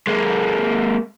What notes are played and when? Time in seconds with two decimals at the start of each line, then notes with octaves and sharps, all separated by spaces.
0.07 G#3 A#3